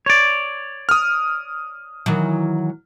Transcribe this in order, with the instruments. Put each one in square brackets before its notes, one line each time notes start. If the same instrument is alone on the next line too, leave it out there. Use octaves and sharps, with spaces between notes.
[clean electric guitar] C#5 D5
[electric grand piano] D#6 F6
[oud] D#3 E3 F#3